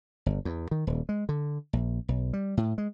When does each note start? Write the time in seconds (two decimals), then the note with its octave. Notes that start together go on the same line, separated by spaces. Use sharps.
0.26 G1
0.45 E2
0.71 D#3
0.87 D#1
1.09 G#3
1.29 D3
1.73 A#1
2.08 B1
2.33 G3
2.57 A2
2.78 G#3